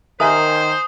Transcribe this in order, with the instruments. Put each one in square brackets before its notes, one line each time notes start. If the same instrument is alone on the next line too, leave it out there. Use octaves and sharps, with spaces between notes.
[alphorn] D#3 [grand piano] A#4 E5 G#5 [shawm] C5 [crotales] D#6